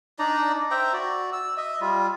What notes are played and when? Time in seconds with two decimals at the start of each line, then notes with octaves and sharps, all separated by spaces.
0.19 D4 D#4 D5 A#5
0.71 C5 E5 G5 A#5
0.93 F#4 D5
1.33 E6
1.57 D#5 E5
1.81 G3 F4